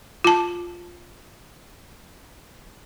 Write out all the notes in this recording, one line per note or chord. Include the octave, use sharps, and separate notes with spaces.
F4 A5